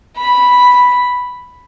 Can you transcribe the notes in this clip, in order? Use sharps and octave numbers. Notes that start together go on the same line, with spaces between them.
B5